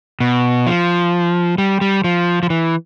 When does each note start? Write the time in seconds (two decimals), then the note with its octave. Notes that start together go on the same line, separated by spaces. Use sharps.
0.20 B2
0.67 F3
1.58 G3
1.81 G3
2.04 F3
2.43 F3
2.50 E3